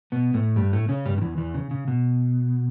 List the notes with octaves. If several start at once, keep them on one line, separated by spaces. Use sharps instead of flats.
B2 B3
A2 A3
G2 G3
A2 A3
C#3 C#4
G2 G3
D3
E2 E3
E2 E3
C#3
C#3
B2